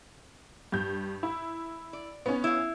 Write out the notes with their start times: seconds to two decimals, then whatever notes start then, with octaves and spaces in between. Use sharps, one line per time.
0.72 G2 G6
1.23 E4
1.93 D5
2.26 B3 C#4
2.44 E4 F5